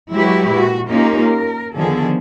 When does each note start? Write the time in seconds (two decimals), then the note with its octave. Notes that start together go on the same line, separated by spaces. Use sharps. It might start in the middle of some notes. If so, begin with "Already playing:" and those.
0.12 F#3 G#3 E4 F#4 G4 B4
0.51 A#2 F#4
0.88 A#3 C#4 D#4 F4 G4 A#4
1.20 A#4
1.76 D3 D#3 F3 B3 G#4 A4